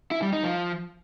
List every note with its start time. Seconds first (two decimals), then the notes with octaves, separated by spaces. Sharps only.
0.11 E4
0.22 G3
0.33 D#4
0.43 F3